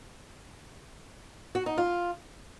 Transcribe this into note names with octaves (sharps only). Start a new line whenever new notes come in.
F#4
D#4
F4